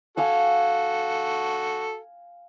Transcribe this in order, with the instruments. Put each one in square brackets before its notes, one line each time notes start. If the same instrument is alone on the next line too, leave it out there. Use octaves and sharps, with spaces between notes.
[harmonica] F#4 A4 [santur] F5 G#5 E6